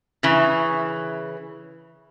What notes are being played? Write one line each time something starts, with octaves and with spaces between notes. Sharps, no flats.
C#3 E3